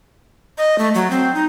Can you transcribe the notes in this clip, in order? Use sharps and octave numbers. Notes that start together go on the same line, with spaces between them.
D#5
A3
F#3
C4
D#4